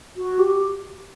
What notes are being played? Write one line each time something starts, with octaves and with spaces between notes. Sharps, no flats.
F#4
G4